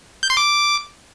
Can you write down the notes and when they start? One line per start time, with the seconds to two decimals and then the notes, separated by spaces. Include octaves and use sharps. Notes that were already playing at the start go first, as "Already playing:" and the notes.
0.23 G6
0.30 C6
0.37 D6